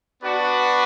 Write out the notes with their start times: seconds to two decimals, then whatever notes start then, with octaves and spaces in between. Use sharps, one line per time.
0.22 B3 D4 F#4 B4 D5